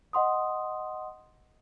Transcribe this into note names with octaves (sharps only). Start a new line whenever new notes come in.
D#5 F#5 C6 D#6